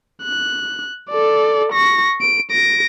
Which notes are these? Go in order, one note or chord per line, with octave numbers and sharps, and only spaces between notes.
F#6
A4 D5
C#6 A#6
D7
A#6 D7